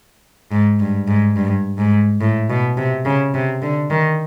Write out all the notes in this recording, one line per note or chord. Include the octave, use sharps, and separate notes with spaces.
G#2
G2
G#2
G2
G#2
A2
B2
C3
C#3
C3
D3
D#3